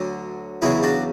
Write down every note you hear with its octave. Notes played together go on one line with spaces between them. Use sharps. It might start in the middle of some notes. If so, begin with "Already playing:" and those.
Already playing: D2 D3 F#3
E2 C#3 F#3 E4 G#4
D4 F#4